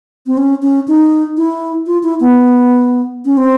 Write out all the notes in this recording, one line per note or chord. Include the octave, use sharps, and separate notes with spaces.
C4
C#4
C#4
D#4
E4
F4
E4
B3
C#4
C4